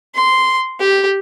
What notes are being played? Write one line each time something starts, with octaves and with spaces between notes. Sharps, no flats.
C6
G4